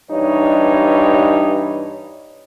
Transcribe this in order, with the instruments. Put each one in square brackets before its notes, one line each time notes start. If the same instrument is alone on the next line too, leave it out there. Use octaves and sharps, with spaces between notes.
[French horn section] G2 E3 D#4 C#5